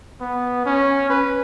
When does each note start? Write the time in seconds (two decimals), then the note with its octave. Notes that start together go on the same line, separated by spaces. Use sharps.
0.21 B3
0.66 C#4
1.10 B4